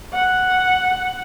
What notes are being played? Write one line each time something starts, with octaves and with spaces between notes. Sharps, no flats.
F#5